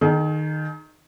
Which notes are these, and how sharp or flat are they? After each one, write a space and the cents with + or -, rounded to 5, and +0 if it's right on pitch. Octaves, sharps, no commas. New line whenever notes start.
D#3 -15 G#4 +35